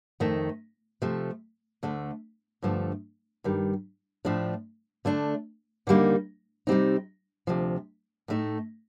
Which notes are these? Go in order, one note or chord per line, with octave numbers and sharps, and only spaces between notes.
F2 D#3 A3
C3 F3 A3
D2 D3 A3
G2 D3 F3 A3
G2 D#3 G3
A2 F3 A3 D4
D3 A3 D4
D#2 D3 G3 A#3 D#4
C3 G3 C4 D#4
D2 C3 F3
A2 A3 D#4